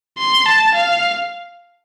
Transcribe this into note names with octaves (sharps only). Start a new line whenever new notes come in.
C6
A5
F5